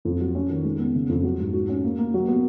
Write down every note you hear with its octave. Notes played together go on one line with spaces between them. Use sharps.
F2
F#3
C#4
D#3
G#3
B3
C#3
F2
F#3
G#2
F#4
C#4
A#3
A#3
F#3
B3